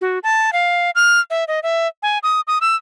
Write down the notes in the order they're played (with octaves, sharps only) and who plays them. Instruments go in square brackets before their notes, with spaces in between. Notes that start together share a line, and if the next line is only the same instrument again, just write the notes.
[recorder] F#4
A5
F5
F6
E5
D#5
E5
G#5
D#6
D#6
E6